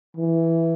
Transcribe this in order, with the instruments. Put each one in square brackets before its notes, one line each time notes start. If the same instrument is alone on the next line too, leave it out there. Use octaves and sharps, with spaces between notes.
[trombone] E3